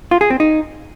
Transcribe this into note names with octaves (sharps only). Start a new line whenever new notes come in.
F4
G#4
C4
D#4